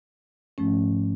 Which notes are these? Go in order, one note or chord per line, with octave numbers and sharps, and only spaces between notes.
G#2 F3 A3 C#4